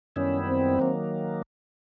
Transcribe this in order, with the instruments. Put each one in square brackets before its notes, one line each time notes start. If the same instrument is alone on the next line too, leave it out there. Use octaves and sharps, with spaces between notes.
[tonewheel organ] F#2 D#3 G3 B3 E4 [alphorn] C#4
[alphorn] C4
[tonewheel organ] D#3 F#3 A#3